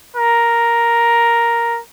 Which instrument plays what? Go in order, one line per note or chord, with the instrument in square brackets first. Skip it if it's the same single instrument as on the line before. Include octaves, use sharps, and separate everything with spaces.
[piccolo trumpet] A#4